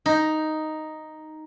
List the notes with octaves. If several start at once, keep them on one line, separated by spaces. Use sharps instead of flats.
D#4